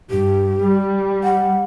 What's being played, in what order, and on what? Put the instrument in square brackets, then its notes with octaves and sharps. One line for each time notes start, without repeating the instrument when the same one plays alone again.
[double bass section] G2 [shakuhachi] G4
[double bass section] G3
[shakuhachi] F#5